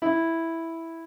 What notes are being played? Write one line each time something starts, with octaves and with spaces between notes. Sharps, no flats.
E4